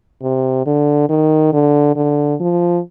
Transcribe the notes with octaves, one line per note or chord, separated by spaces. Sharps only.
C3
D3
D#3
D3
D3
F3